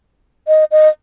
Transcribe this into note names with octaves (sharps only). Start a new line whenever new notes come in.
D#5
D#5